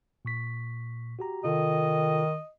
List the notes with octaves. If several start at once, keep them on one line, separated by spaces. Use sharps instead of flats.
A#2 C#6 B6
F#4 G4 A#5
C3 D#3 F4 A4 D#5